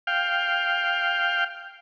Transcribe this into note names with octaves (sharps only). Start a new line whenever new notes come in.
F5 G5